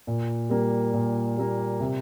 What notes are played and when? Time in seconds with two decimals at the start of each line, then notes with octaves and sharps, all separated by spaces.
0.07 A#2
0.50 G3 A#3
0.94 A#2
1.38 G3 A#3
1.80 C3